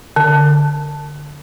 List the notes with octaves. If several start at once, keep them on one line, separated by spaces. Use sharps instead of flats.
D3